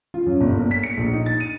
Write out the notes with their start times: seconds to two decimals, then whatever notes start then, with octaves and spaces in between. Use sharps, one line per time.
0.14 F4
0.26 F#2
0.41 G1
0.57 A#3
0.71 B6
0.83 C#7
0.97 A#1
1.13 D#4
1.26 A6
1.40 D#7